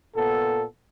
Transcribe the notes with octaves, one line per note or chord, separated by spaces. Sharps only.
A#2 B3 A4